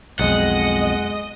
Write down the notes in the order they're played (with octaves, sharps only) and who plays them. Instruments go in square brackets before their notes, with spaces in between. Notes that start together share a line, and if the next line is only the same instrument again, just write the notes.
[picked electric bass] B1 F2 [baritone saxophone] G#3 [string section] D#5 [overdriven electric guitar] F#5